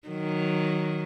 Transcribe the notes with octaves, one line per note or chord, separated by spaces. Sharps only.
D#3 F#3